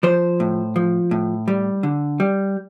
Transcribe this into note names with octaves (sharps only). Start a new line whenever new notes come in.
F3 C5
A2
F3
A2
G3
D3
G3